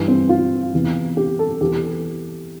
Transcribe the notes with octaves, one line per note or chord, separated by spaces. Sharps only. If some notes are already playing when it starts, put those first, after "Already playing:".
Already playing: G2 E3
C4
F4
E2 C3 E3
G4
A4
E2 E3 G4